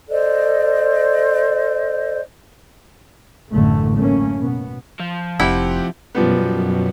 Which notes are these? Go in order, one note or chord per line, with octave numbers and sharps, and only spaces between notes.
A4 C5 D5 D#5
A1 F#2 D3 A3
F#2 A3 A#3 C#4
B2 B3
F3
F1 C4 E4 G4 F#5
F#2 B2 F3 G3 B3